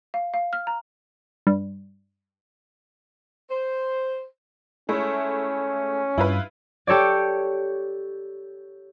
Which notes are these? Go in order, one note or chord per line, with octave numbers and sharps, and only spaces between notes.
F5
F5
F6
A#5
G2
C5
G#3 A3 C#4 E4
G2 E4 F4 B4
G4 A4 C#5 D5